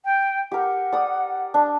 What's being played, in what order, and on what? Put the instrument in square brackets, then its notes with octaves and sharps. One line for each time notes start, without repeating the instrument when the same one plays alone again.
[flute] G5
[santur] G4 A#4 [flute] F#5
[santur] D5 D#6
D4